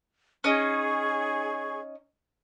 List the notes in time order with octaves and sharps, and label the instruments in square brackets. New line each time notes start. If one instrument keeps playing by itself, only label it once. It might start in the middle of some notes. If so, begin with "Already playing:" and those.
[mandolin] C#4 D#4 [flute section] G#4 C#6